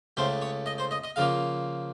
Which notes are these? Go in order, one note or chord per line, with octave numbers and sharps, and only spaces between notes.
C#2 C#3 A3 C5
C#5
D#5
C5
D#5
D#5
C#3 F3 A#3 F5